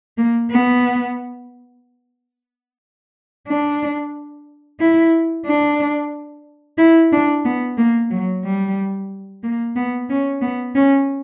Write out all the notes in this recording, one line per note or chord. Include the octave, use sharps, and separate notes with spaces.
A#3
B3
D4
E4
D4
E4
D4
B3
A#3
F#3
G3
A#3
B3
C#4
B3
C#4